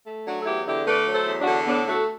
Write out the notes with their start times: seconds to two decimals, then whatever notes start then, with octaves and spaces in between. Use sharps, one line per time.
0.06 A3
0.25 F#3 D4 F#4
0.40 A4
0.46 E2 E4 G4
0.66 D3 E4 G4
0.86 A3 B4 D5
1.06 F#3
1.13 A4 C5
1.27 E2
1.40 D4 F#4
1.47 D3
1.67 A2 B3 D4
1.88 A3 F#4 A4